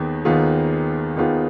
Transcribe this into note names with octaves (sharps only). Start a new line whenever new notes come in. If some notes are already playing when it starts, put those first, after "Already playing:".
Already playing: D#2 D#3 B3 G#4
D#2 D#3 B3 F4 G#4
D#2 D#3 B3 F4 G#4